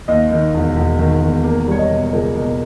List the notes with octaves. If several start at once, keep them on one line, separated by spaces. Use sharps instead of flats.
D#2 D#5
D#3
E1
E1
D#3
E1
A#3
G3 C#5
D#5
B2
C#2 A#4
B2